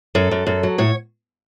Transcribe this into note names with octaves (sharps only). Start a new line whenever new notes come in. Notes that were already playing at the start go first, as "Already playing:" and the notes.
F#2 A4
F#2
F#2
F#3
A2 C#5